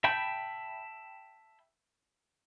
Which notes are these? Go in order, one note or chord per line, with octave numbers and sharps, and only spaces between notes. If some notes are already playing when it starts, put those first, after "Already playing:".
E5 G5 A5 B5 G6